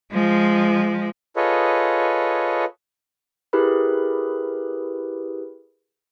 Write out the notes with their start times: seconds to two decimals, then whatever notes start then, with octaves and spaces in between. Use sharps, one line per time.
0.12 F3 G#3
1.36 F4 G#4 A4 B4 C#5 D#5
3.53 E4 G4 G#4 A#4 B4 B5